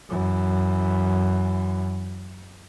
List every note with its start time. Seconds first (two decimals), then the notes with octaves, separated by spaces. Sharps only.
0.10 F#2 E3